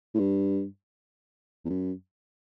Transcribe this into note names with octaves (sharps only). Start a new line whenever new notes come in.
A2
G2
E2
F#2